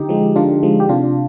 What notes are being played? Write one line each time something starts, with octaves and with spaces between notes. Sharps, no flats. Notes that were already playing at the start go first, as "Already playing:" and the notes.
Already playing: D3 D#4 G4
F3 G#3
D3 D4 F4
F3 G#3
G4
C3 D4 F4